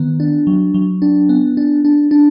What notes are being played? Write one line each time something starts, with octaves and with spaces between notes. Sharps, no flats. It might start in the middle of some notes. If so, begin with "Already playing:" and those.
Already playing: D#3 B3
D4
F#3
F#3
D4
B3
D4
D4
D4